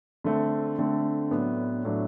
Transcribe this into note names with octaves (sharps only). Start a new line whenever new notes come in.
D3 A3 C4
D3 A3 C4
A2 F#3 B3 D4
A2 F#3 B3 D4